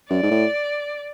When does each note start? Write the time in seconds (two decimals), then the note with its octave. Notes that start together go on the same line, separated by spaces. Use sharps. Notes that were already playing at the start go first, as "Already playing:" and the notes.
0.10 F#2 D5
0.23 G#2
0.31 A2